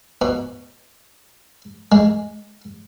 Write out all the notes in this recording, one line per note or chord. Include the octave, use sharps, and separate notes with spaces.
B2
G#3